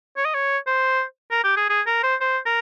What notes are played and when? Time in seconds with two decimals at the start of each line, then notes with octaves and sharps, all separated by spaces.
0.17 C#5
0.25 D#5
0.34 C#5
0.67 C5
1.31 A#4
1.44 G4
1.57 G#4
1.69 G#4
1.86 A#4
2.04 C5
2.21 C5
2.46 A#4